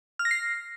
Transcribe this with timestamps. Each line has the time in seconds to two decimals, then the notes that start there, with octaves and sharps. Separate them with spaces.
0.19 F6
0.25 A#6
0.31 C7